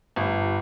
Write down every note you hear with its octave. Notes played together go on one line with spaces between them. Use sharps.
G1